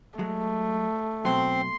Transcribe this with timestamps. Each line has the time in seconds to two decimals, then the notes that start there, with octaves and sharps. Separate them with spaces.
0.19 F#3 G#3 A3
1.25 B2 F#3 C4 C6